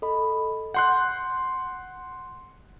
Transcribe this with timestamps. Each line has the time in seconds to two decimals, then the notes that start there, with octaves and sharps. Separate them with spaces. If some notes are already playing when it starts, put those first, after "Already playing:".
0.02 A4 D#5 B5
0.74 F#5 C6 F#6 G6